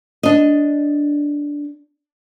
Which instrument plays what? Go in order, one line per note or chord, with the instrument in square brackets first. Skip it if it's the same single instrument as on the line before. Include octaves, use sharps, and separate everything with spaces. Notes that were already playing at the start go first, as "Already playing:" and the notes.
[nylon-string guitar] D4 D#5